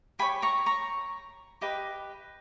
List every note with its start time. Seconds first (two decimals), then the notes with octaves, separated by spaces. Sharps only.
0.19 G4 C#5 G#5 B5
0.42 A#5 C#6
0.66 A#5 C#6
1.61 G4 B4 D#5